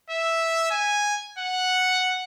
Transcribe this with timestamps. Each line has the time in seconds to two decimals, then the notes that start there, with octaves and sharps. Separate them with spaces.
0.10 E5
0.71 G#5
1.39 F#5